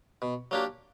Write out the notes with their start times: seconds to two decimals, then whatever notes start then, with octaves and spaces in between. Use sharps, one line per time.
0.22 B2
0.51 F#3 A#3 D4 G4